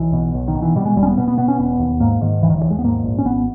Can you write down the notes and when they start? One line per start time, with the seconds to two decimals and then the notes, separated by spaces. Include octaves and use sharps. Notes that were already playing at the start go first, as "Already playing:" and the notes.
Already playing: B1 E3
0.13 B2
0.34 B1
0.48 D#3
0.55 B2
0.62 E3
0.76 B2 G3
0.86 G#3
0.97 E1 G3
1.03 C#4
1.07 B3
1.17 B2 B3
1.28 B3
1.38 B2 B3
1.48 C#4
1.59 E1 B3
1.79 D#2
2.00 G#2 A#3
2.21 G#2 D#3
2.42 E1 E3
2.50 D#3
2.56 E3
2.63 D#2
2.71 G#3
2.79 B3
2.84 G#2 A#3
3.04 A#1
3.18 C#4
3.25 G#1 B3